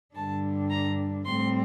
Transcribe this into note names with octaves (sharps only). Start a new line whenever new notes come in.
G2 D3 G3 D4 A5
A#5
A2 G3 C4 C6